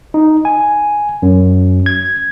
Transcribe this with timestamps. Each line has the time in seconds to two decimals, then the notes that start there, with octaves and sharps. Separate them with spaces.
0.14 D#4
0.45 G#5
1.22 F#2
1.86 G#6